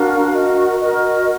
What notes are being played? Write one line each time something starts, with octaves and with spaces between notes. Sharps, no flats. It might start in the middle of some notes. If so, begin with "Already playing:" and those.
Already playing: D4 F#4 A#4 F5
F#4 A#4 D#5
F#4 A#4 D#5